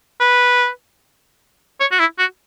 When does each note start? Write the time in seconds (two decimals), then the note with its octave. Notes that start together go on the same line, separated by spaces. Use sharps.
0.20 B4
1.80 C#5
1.91 F#4
1.99 E4
2.19 F#4